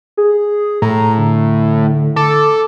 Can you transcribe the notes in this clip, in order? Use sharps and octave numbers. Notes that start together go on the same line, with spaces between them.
G#4
A2 A#5
D3
A4 D6